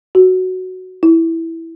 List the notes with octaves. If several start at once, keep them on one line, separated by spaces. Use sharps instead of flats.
F#4
E4